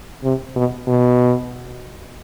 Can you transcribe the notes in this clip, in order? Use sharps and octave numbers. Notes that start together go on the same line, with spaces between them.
C3
B2
B2